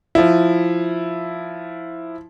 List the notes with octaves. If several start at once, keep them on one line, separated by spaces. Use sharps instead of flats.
F3 E4